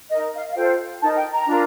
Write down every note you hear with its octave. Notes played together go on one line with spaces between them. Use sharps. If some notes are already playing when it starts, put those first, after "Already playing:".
D#4 A#4 D#5
F5
F5
F4 A4 C5 G5
D#4 A#4 A5
G5
A#5
D4 F4 A#4